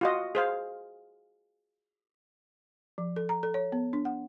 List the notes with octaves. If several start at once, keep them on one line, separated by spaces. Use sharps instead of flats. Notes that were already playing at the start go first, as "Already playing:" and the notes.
F4 F#4 D#5
G#4 C5 F5
F3
A4
A#5
A4
C#5
B3
D4
F#5